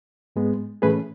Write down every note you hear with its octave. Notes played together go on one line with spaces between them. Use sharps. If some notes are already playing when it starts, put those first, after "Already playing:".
G#2 G#3 B3
A2 E3 A3 C#4 G#4 B4